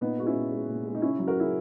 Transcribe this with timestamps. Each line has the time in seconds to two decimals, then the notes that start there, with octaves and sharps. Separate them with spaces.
0.01 A#2 B3 D#4
0.18 G#3 F#4
0.26 C#4 E4
0.35 A#2
0.51 G#3
0.68 A#2
0.85 G#3
0.95 D#4
1.02 C#3 C#4 E4
1.19 F#3
1.27 F#4 A#4
1.35 C#3 E4 G#4